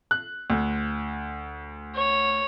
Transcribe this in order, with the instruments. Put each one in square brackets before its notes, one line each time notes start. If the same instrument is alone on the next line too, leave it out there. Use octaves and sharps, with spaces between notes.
[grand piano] F#6
D2
[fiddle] C#5